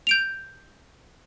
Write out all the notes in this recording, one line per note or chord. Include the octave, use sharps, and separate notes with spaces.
G6 D7 F7